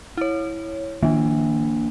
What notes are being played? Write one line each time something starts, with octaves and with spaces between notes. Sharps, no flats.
E4 C#5
D#3 A#3 D4